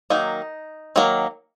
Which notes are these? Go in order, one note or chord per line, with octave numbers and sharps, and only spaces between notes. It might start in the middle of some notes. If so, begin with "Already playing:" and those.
D#3 F#3 A#3 D#4
D#3 F#3 A#3